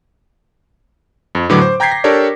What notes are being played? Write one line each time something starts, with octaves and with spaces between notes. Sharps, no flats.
F2
A2 D3 F#3 B4 D6
C5
G5 A#5 G6 G#6 B6 C7
A#6
D4 G4 A4 A#4 C#5 D5